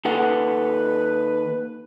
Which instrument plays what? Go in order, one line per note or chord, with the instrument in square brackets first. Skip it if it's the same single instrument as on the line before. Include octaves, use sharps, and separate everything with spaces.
[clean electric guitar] D#2 A4 F#5 [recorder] B4